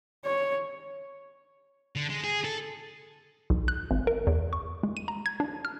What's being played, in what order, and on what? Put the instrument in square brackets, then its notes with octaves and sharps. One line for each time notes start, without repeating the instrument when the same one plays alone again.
[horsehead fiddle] C#5
[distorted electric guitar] D3
G#3
G#4
A4
[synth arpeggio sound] B1
F#6
G#1
A#4
E2
C#6
G#3
D#7
A#5
G#6
D4
F6